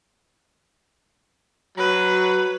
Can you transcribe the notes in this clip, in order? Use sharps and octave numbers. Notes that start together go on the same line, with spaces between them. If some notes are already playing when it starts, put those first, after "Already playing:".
F#3 B4